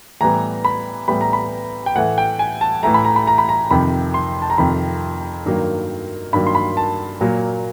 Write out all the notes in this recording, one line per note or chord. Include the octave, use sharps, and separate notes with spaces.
A2 E3 G3 B3 A#5
B5
A2 E3 G3 B3 B5
A#5
B5
G5
A2 E3 A3 F#5
G5
G#5
A5
A2 E3 A3 A#5
B5
A#5
B5
A#5
B5
A#5
F2 C3 D#3 B5
C6
A5
A#5
F2 C3 D#3 B5
G2 D#3 F#3 A#3
G2 D#3 F#3 A#3 B5
C6
B5
A5
A#2 F#3 A#3